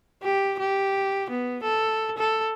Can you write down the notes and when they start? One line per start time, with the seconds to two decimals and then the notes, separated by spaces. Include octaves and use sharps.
0.23 G4
0.59 G4
1.30 B3
1.63 A4
2.18 A4